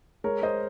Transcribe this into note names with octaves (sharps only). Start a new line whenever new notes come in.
G#3 A#4 C#5
G#3 C5 D#5